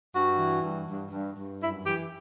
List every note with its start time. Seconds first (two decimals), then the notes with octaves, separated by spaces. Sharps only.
0.15 G2 F#4
0.38 E3
0.63 G2
0.88 G2
1.11 G2
1.36 G2
1.61 F#2 E4
1.85 E3 G4